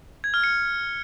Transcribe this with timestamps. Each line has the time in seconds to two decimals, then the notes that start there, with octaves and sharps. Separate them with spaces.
0.24 G#6
0.34 F6
0.44 C#7